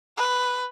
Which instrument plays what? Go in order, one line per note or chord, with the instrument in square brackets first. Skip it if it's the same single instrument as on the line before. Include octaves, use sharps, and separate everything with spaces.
[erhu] B4